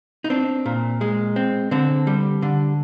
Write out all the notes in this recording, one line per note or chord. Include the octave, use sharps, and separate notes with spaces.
D#4
C4 D4
A#2
G#3
C4
D3 C4
G3
D3